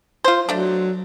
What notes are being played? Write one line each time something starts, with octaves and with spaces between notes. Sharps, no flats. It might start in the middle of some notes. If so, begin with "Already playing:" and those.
F4 C5
F#3 A3 D4